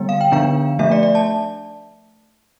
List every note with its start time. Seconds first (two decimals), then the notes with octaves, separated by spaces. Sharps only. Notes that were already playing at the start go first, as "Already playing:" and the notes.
Already playing: D3 G3 B3
0.09 F5
0.21 G5
0.32 D3 F3 B3 D4 F5
0.79 F3 A3 D4 E5
0.92 D5
1.03 D5
1.15 A5